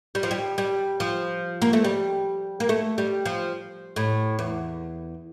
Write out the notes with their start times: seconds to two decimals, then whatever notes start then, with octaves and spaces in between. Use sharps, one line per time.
0.15 G3
0.23 F3
0.31 G3
0.58 G3
1.00 F3
1.62 A#3
1.73 A3
1.84 G3
2.60 A#3
2.69 A3
2.98 G3
3.26 F3
3.96 A2
4.39 E2